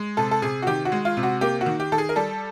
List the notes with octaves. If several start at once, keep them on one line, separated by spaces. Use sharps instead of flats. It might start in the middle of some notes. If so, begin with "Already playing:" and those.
Already playing: G#3
C3 A4
A4
C3 G#4
F#4
D#3 G4
F#4
G#3
F4
C3
F#4
A#3 G4
F#4
D#3
G4
D#3 A4
G#4
A#4
G3 A4